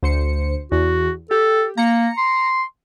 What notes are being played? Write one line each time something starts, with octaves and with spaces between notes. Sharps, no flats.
D2 C5 C#7
E2 F#4
G4 A4
A#3 A#5 C#7
C6